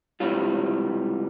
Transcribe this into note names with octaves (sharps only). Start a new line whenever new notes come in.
C#2 C3 E3 G3 F4